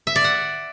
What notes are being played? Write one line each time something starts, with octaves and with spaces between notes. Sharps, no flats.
E5
D5
F#5